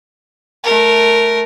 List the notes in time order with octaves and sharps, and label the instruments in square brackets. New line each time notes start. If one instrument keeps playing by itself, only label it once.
[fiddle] A3 A#4